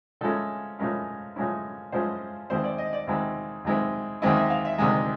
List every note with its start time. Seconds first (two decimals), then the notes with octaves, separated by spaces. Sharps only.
0.21 A2 F3 G#3 C#4 E4 A4
0.79 A2 F3 G#3 C#4 E4 A#4
1.36 A2 F3 G#3 C#4 E4
1.92 A2 F3 G#3 C#4 E4 C5
2.50 D#2 D#3 G#3 C4 E4 C5
2.64 D5
2.78 D#5
2.93 D5
3.07 D#2 D#3 G#3 C4 E4
3.65 D#2 D#3 G#3 C4 E4
4.22 D#2 D#3 G#3 C4 E4 D#5
4.37 E5
4.50 F5
4.65 E5
4.78 D2 C3 D#3 G#3 D#5